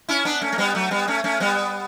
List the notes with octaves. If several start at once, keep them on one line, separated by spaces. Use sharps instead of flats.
C#4 E4
B3 D4
A3 C#4
A3
G3 B3
F#3 A3
G3 B3
A3 C#4
A3 C#4
G3 B3